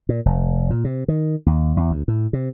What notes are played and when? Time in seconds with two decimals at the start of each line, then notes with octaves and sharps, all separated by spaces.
0.09 A#2
0.26 F1
0.70 A#2
0.84 C3
1.08 D#3
1.46 D#2
1.77 E2
1.91 D2
2.08 A2
2.33 C3